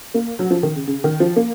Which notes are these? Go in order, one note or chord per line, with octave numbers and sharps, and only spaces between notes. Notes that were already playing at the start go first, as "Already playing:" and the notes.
A#3
F#3
F3
D#3
C#3
C#3
D#3
F3
A#3